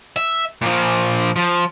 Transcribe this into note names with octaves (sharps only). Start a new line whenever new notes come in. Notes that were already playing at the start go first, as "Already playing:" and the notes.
E5
A#2 F3
F3